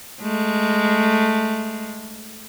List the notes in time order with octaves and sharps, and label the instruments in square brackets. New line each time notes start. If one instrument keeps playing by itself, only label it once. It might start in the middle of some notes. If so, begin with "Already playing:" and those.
[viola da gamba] G#3 A3